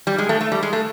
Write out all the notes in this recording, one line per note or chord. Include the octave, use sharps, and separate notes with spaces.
G3
G#3
A3
A3
G3
G#3
A3